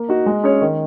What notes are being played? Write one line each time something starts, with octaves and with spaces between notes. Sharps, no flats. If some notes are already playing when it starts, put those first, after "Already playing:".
Already playing: A#3
D#4 F#4
G#3
C#4 G#4 C#5
D#3